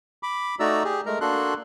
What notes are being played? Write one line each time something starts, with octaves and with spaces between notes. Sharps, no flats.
B5 D6
A3 D#4 F#4 D5 A#5 E6
G4 G#4
G#3 A3 A#4 A#5
A#3 D4 F#4 A4 C6 F#6